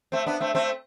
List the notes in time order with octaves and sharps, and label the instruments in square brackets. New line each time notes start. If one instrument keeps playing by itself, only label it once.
[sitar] A3 C4
B3 D4
A3 C4
A3 C4